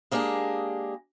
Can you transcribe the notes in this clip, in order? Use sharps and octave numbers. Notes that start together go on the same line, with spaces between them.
G#3 A#3 D4 G4 G#4